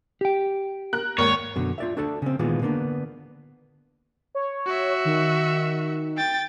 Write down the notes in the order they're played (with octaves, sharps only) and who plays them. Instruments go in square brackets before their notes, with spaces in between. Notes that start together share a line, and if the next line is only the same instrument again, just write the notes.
[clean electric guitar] G4 G5
[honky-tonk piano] A#4 F#6
[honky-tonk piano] G#1 D#2 A#4 [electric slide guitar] C#5
[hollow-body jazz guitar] F#2 B2 D3
F4 D5 E5
D4 F#4 A4 D5 A5
C#3 C4
A#2 D#3 E3 G#3 B3 F4
D3 A#3 B3 C#4 D4
[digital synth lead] C#5
[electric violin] F#4 E5
[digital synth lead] D#3
[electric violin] G5 A6